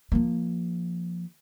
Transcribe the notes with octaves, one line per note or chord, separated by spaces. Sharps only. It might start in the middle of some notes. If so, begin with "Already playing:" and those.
F3 A#3